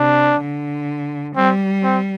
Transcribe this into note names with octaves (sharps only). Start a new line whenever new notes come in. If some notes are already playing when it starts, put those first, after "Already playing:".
Already playing: C3 D4
D3
G3 C4
C4